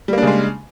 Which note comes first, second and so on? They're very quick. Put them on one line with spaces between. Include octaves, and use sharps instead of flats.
G3 A#3 D4 C#3 G#3